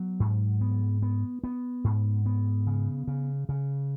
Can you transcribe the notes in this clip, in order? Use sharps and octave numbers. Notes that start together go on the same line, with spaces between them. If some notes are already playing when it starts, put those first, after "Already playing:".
Already playing: F#3 B3
G#2
B3
B3
B3
G#2
B3
C#3
C#3
C#3